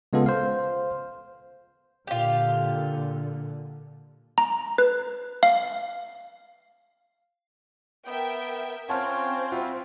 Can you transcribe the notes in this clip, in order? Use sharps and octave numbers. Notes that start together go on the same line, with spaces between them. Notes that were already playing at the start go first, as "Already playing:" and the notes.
C#3 G#3 B3 F4 A4
C5 F5
A#2 D3 F4 G4
A#5
B4
F5
B3 A#4 E5 G5
C4 C#4 F4 C#5 F#5 A5 F6
G3 F4 E5 F#5 G5